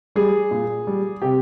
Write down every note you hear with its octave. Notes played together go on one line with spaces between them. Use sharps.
G3 G#4
A#2
G3
C3 G4